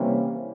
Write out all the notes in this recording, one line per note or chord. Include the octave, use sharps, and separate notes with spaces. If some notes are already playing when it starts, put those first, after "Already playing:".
Already playing: C3 E3 G3 A#3 C#4